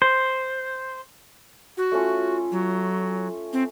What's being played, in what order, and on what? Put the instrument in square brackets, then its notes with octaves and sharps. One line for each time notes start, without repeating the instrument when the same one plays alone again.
[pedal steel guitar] C5
[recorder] F#4
[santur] A3 C#4 F4
[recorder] F#3
C4